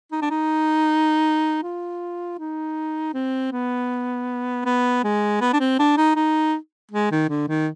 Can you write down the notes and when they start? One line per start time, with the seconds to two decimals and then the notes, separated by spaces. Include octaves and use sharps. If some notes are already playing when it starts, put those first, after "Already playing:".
0.12 D#4
0.22 D4
0.30 D#4
1.63 F4
2.39 D#4
3.14 C4
3.52 B3
4.65 B3
5.04 G#3
5.41 B3
5.53 D4
5.60 C4
5.79 D4
5.97 D#4
6.16 D#4
6.91 G#3
7.11 D#3
7.29 D3
7.48 D#3